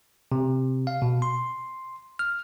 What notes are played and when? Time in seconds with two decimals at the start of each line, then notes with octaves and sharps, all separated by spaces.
0.32 C3
0.87 F5
1.02 B2
1.22 C6
2.19 F6